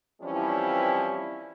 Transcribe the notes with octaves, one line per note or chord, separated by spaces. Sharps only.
E3 F3 G3 C4 C#4 E4